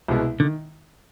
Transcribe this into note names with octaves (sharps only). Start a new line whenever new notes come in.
C2 B2 G#3 B3 E4
D3 D#3